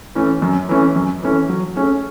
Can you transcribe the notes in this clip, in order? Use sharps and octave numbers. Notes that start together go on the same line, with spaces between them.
E3 A3 C#4
F#2
E3 A3 C#4
F#2
E3 A3 C#4
F#3
A3 C#4 G#4